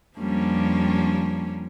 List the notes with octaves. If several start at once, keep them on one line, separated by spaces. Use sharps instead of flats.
F2 F3 G3 A#3 C#4 D4